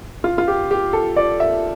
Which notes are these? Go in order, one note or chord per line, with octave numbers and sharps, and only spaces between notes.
F4
F4
G4
G4
A4
D5
E5